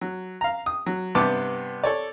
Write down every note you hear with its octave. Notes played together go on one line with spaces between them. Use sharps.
F#3
F5 A#5
D#6
F#3
G2 C3 B3 A5 D6
A4 C#5 D5